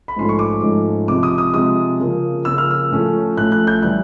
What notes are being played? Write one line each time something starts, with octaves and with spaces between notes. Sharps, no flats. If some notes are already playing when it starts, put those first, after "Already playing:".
B5
G#2 F3 A3 C#4 C6
C#6
D6
G#2 F3 A3 C#4
C3 F3 G#3 D6
D#6
D#6
C3 F3 G#3 D#6
C#3 F3 A#3
C#3 F3 A#3 E6
F6
E6
A2 F3 A3 C#4
A2 F3 A3 C#4 F#6
F#6
G6
E3 G3 F#6